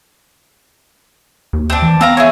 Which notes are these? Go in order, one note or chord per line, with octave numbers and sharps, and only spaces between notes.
D#2
C4 D4
E3
B3 C4 F5 A#5
E4 G#4 C#5